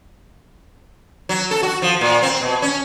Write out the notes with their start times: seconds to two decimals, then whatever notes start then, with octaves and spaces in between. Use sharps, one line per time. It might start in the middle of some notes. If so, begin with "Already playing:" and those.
1.29 F#3
1.51 A4
1.63 F#4
1.82 F3
2.01 A#2
2.22 C4
2.41 B2
2.62 C#4